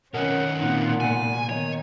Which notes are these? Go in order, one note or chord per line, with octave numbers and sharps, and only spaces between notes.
B2 D#3 C#4 A#4 D#5 F#5 G#5
A#2 C4 D#4
C3 B3 D5 G#5
D#3 C#5